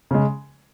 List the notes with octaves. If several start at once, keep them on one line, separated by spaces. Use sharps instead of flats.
C#3 G#3